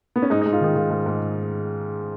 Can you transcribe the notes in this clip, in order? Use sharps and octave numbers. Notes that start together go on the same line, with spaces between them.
B3
C#4
G#2 D#4
D#4
G#2
F4
D#3 D#4
D#3 F4
G#2
G#2